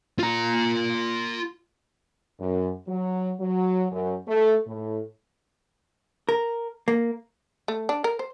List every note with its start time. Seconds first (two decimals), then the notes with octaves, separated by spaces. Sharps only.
0.19 F4 A#5
2.40 F#2
2.88 F#3
3.40 F#3
3.92 F#2
4.28 A3
4.68 A2
6.29 A#4
6.88 A#3
7.68 A3
7.89 D4
8.04 A#4
8.19 C5